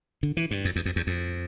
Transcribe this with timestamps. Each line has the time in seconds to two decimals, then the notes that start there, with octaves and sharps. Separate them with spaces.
0.23 D3
0.37 E3
0.51 G2
0.65 F2
0.76 E2
0.86 F2
0.96 E2
1.07 F2